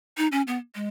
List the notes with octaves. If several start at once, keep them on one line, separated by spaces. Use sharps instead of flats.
D#4
C#4
B3
G#3